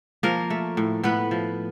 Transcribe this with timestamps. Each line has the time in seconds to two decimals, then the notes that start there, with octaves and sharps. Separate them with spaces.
0.23 F3 A#3 A#4
0.50 A3
0.77 A2
1.04 A2 B3 B4
1.31 F3